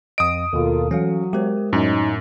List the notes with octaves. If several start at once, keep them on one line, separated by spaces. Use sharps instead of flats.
F2 D#5 D#6 D7
D#2 B2 F4 A4 A#4
E3 F#3 C#4 A4 F5
G#3 G4 A#4 C5
F#2 A2 C#4 D#4